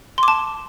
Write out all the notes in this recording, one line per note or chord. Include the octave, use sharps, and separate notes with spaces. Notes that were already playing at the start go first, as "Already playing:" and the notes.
A5 C6 D6